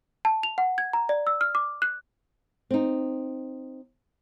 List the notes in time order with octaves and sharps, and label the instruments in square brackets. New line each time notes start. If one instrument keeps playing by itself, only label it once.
[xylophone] A5
F7
F#5
G#6
A#5
D5
E6
F6
D6
F#6
[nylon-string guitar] C4 D#4